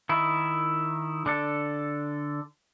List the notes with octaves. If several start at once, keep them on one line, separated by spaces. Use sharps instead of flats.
D#3 E4
D3 D4 A4